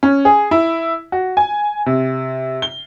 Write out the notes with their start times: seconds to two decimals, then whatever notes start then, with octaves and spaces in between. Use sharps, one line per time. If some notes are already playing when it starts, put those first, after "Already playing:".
0.03 C#4
0.25 G#4
0.51 E4
1.12 F#4
1.37 G#5
1.86 C3
2.62 G7